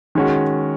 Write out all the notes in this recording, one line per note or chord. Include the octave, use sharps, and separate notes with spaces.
D#3 G#3 C#4 F#4